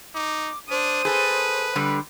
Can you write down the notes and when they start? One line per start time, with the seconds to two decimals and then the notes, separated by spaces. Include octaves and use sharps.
0.15 D#4 D6
0.71 D4 C5 D#6
1.05 G#4 A4 B4
1.76 D3 G3